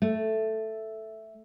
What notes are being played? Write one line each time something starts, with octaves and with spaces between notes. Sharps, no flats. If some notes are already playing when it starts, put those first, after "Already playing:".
A3